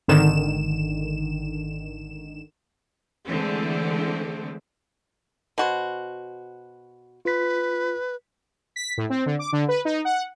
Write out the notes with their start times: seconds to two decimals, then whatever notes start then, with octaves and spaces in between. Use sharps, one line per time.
0.08 G#1 D3 D#3 E7
3.27 D3 E3 G#3 A3 C4
5.58 B2 F#4 C5
7.25 F4 B4 B6
8.76 B6
8.98 A2
9.10 C4
9.26 D3
9.39 D6
9.53 D3
9.68 B4
9.85 D#4
10.05 F#5